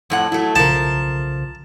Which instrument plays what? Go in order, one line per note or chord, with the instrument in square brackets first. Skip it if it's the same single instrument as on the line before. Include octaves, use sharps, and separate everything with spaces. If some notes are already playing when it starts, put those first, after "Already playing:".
[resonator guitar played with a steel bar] F2 A2 F#5
[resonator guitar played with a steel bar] F#3 A3 [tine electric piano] E4
[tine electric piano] B1 C#3 [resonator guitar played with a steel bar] F3 A#4 [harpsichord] A5